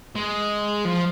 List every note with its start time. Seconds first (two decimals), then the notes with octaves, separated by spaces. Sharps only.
0.15 G#3
0.85 F3